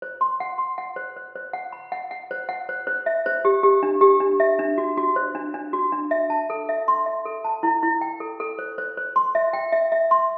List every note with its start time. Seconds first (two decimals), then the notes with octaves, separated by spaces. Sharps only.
0.02 C5
0.21 C6
0.40 F#5
0.58 C6
0.78 F#5
0.96 C5
1.17 C5
1.35 C5
1.53 F#5
1.72 B5
1.92 F#5
2.11 F#5
2.31 C5
2.49 F#5
2.69 C5
2.87 C5
3.06 E5
3.26 C5
3.45 G4
3.63 G4
3.83 D4
4.01 G4
4.20 D4
4.40 E5
4.59 D4
4.78 F#4
4.97 F#4
5.16 C5
5.35 D4
5.54 D4
5.73 F#4
5.92 D4
6.11 E5
6.30 A5
6.50 A4
6.69 E5
6.88 C6
7.06 E5
7.26 A4
7.44 A5
7.63 E4
7.83 E4
8.01 G5
8.20 A4
8.40 A4
8.59 C5
8.78 C5
8.97 C5
9.16 C6
9.35 E5
9.53 G5
9.72 E5
9.92 E5
10.11 C6